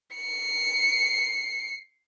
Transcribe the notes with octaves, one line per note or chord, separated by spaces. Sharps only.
C7 C#7